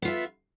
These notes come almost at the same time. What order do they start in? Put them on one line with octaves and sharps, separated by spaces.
B3 F4 E5